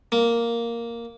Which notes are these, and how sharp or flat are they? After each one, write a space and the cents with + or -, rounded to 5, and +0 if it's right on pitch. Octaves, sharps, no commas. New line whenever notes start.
A#3 +0